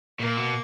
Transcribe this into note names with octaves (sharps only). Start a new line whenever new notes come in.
A#2 A#3
B2